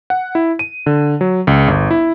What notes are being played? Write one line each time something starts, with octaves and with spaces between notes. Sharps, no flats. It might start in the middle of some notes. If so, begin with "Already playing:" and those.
F#5
E4
D#7
D3
F#3
C#2
G1
E4